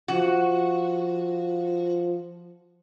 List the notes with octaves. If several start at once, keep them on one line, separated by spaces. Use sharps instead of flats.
F3 F#4